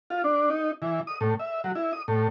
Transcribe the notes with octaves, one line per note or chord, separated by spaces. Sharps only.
F4
D4
D#4
E3
D#6
A2
E5
F#3
E4
D#6
A2